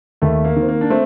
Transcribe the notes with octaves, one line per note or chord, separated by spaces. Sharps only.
D#2 A3
A#3
D#3
C4
A#3
D4
A3 C4